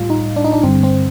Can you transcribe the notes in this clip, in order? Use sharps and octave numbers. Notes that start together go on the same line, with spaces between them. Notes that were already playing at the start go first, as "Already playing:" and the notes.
Already playing: A2 G3 F4
D#4
D4
D#4
D4
G2 D3 G3 C4
C4